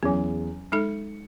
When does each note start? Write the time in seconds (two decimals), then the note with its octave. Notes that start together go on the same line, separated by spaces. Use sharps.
0.03 E2 F#3 C#4 G#4 G#5
0.72 G#3 D#4 A4 C#7